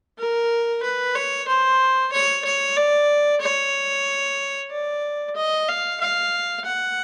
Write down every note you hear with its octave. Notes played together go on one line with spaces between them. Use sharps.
A#4
B4
C#5
C5
C#5
C#5
D5
C#5
D5
D#5
F5
F5
F#5